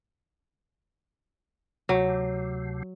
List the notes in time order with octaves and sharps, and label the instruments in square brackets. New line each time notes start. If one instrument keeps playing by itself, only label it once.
[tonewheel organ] D2 C3 [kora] F#3